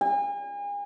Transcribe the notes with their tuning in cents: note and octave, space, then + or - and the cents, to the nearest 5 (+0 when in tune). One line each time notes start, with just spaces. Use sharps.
G#5 -40